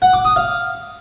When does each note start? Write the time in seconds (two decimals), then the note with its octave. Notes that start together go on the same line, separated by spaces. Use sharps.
0.02 F#5
0.13 D6
0.25 D#6
0.36 F5